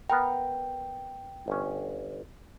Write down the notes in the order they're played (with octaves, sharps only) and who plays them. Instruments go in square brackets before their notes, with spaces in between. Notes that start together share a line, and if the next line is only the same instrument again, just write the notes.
[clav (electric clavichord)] B3 A#4 A#5 [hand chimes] G5
[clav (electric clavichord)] G1 C#4